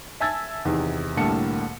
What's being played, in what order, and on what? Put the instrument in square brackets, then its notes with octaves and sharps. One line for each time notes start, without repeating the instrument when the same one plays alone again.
[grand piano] E5 G#5 A5 E6 G#6 A6
E2 C3 D#3
C2 A2 D3 A#3 A5 C#7